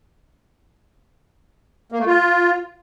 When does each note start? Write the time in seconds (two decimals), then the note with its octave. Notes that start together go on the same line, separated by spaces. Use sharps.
1.92 A#3
1.99 A3
2.07 F4